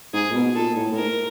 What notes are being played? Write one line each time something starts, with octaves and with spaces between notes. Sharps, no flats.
G#2 G#4
A#2
B2
A#2 A4
A2
A2
G#2 A#4